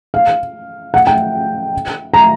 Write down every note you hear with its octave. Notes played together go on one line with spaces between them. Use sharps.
F5
F#5
G5
A#5